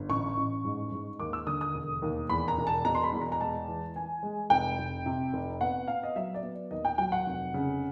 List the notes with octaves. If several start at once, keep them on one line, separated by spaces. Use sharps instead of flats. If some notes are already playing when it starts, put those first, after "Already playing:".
Already playing: G1
A1 C#6
A1
G#2
G#2
D#2 D6
E6
D3 D#6
D#6
E1
D#2
E2 B5
A#5
E1
A5
B2 A#5
C6
B5
E2
A#5
A#5
G#3 A5
E3
E3 G#5
G#3
F1 G5
F1
C3
F1
B3 F#5
B3 F5
D#5
F#3 E5
D5
B3
D#2 D#5
G5
F#3 G5
F#5
F1
C#3